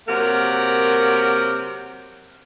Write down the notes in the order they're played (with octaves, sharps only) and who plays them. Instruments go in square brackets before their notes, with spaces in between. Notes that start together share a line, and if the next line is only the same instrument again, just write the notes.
[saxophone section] C3 F#3 A#3 A#4 F#5